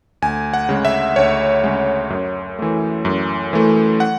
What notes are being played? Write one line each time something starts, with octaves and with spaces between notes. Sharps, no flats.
D2 G#5
F#5
C#3 G#3
E5
D2 C#5
C#3 G#3
F#2
E3 A3
F#2
E3 A3
F#5